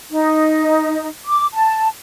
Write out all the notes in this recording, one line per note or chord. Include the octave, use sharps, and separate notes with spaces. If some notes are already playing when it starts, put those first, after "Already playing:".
D#4
D6
A5